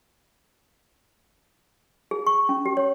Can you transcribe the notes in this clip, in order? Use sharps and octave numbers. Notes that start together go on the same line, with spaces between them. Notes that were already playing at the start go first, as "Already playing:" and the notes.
G#4
C#6
C#4
G4
C#5